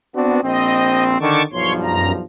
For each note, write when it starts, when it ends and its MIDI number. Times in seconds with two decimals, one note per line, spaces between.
0.16 0.39 59
0.16 0.44 60
0.16 0.44 62
0.16 0.44 66
0.44 1.20 34
0.44 1.20 60
0.44 1.04 75
1.21 1.44 50
1.21 1.44 51
1.21 1.42 81
1.21 1.42 85
1.21 1.42 86
1.53 2.24 35
1.53 2.24 43
1.53 2.24 53
1.53 1.73 73
1.53 1.73 84
1.84 2.12 42
1.84 2.12 82